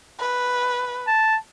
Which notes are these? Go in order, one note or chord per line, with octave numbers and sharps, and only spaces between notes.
B4
A5